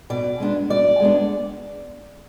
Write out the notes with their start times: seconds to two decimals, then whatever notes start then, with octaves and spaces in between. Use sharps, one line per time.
0.10 B2 D5
0.40 G#3 B3 D4
0.70 B2 D5
1.00 G#3 B3 D4